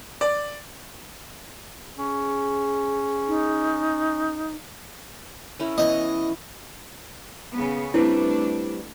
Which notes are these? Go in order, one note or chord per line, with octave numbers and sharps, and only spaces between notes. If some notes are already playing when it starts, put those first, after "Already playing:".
D5
C#4 G#4
D#4
C#4 E4 A#4
E3 B3 C#4 D#5
C#3 B3
G3 A3 C4 D4 E4 B4